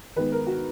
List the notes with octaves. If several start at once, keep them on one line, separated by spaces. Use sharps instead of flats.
D#3 G#3 B3 B4
A#4
F#4